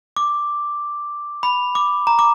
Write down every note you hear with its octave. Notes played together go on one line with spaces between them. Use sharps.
D6
B5
D6
A#5
D6